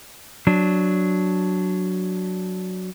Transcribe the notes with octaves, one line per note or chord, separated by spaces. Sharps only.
F#3 D4